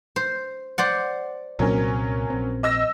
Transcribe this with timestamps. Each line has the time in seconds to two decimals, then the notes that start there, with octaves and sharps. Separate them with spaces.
0.16 C5
0.78 C5 D5 F#5
1.59 C2 A#2 F#3 A#3 C4 C#4
2.30 A#1 C4
2.63 D#5 E6 A#6